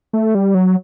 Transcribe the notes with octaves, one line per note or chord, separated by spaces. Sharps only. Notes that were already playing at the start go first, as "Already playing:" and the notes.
A3
G3
F#3